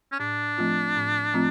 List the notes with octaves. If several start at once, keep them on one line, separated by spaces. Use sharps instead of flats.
C#4
A2 D4
F3 A3 C4 F4
A2
F3 A3 C4 F4